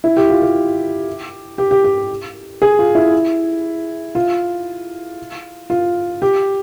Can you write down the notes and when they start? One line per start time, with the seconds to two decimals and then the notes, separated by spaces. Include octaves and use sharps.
0.04 E4
0.17 G4
0.30 F4
0.42 G4
1.58 G4
1.71 G4
1.84 G4
2.62 G#4
2.79 F4
2.95 E4
4.15 F4
5.70 F4
6.22 G4